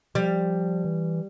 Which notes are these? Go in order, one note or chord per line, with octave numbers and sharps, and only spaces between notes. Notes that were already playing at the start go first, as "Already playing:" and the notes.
F3 G3
E3